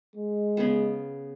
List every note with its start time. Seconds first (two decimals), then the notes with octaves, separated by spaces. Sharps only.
0.16 G#3
0.57 C#3 B3